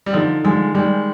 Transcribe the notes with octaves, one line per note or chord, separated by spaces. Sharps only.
G3
D3 F3 D#4
D3 F3 G#3
D#3 G3 G#3